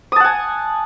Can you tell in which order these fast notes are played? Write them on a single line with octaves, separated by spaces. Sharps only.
D#6 A5 F#5 G#5